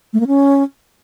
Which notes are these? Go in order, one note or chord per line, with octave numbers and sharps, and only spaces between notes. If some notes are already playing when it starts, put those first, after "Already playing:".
A3
A#3
C#4